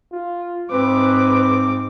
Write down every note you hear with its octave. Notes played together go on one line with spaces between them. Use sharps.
F4
G#2 C4 B4 D6